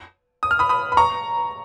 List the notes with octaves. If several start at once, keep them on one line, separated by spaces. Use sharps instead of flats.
D#6
F6
B5 D#6
B5 D#6
B5
A#5 C#6